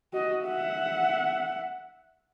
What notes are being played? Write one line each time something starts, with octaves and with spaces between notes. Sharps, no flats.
F#4 D#5
E5 F#5